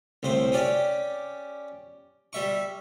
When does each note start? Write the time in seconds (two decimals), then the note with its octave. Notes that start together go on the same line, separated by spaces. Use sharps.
0.23 C2 A2 C5
0.52 C#4 G4 D5
2.33 G3 E5 C#6